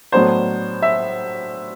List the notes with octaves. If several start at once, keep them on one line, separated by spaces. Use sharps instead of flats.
A2 F#3 B3 D4 C5
E5